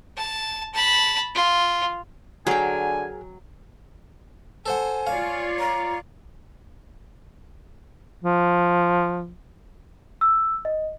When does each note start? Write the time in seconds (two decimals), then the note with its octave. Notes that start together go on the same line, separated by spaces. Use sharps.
0.17 A5
0.74 A5 B5
1.35 F4
2.47 D3 F#3 G#4 A#4 G5 G#5
4.66 A4 C5 F#5 G#5
5.07 F4 C#5 D5 F5
5.59 A#5
8.24 F3
10.21 E6
10.65 D#5